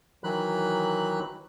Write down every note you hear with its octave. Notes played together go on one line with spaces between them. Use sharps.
D#3 E3 F#3 B5 F#6